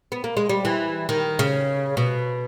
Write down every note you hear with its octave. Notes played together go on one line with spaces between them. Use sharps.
B3
A#3
G#3
G3
E3
D#3
C#3
B2